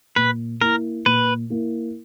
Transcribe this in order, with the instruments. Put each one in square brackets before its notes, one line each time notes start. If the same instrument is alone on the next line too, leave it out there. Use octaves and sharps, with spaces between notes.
[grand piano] A#2 [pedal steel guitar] B4
[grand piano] A#3 E4 [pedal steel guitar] A#4
[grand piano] A#2 [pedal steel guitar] B4
[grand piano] A#3 E4